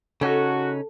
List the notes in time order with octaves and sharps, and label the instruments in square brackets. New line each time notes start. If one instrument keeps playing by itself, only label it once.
[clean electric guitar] C#3 C#4 D#4 [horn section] F#4 [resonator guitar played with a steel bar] A4